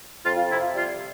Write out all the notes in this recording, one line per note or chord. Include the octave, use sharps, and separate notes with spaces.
F2 F4
F4
C3 E4
F4
G3 F4